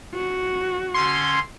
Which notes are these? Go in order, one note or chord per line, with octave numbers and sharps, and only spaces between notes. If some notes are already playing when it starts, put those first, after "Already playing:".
F#4
D3 C#4 C6 G#6